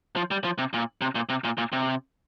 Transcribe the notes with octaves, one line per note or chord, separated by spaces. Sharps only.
F3
G3
F3
C3
A#2
C3
A#2
C3
A#2
A#2
C3